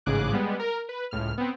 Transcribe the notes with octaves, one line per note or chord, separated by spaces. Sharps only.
A1 G#2 C#3 G#4 D6 F#6
G3 G#3 B3
A#4
B4
C#2 A2 F6
B3 C4